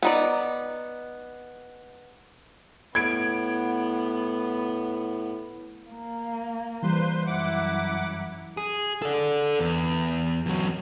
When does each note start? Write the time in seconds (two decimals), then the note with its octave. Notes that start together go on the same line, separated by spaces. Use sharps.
0.02 B3 D#4 D5
2.95 A2 B3 G#6 D7
5.89 A#3
6.83 E3 G3 B4 C5 C6
7.27 F#2 E4 F#5 D6
8.57 G#4
9.02 A4 D5
9.59 E2
10.46 E2 F#3